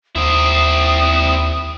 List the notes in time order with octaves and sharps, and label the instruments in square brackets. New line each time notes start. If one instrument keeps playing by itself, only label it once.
[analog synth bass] D#2 [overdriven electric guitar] C4 E4 [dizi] D#6